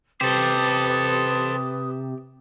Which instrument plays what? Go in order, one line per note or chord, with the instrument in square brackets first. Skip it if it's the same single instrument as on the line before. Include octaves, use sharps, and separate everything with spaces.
[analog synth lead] C3 [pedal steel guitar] G4 [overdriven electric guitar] A4 C5 [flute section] B4 D6 D#6